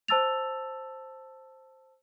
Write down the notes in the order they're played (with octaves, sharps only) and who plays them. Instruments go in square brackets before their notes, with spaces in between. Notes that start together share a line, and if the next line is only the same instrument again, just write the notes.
[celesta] C5 A5 E6 A6 F7